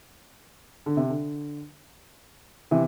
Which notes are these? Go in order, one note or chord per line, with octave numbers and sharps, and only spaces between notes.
D3
C3
D3
C3 E3